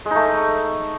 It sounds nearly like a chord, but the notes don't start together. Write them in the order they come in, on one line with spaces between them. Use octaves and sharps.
G#3 D#4 A3